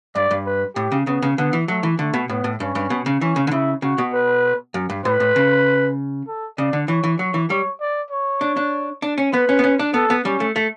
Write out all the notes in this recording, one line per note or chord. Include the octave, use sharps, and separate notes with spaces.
G2 D5
G2
B4
A2 G4
C#3
C#3 B3
C#3
D3 B3
E3
F#3 A3
E3
D3 A3
B2
A2 B3
A2
G2 C#4
G2
B2
C#3
E3 C#4
C#3
D3
C#3 E4
C#3 F#4
B2
B4
F#2
G2
A2 B4
A2
C#3
A4
C#3 D5
D3
E3 C#5
E3
F#3 C#5
E3
G3 C#5
D5
C#5
D4
D4
D4
C#4
B3 B4
C#4
B3
C#4
D4
B3 A4
B3
G3 C#4
A3
A3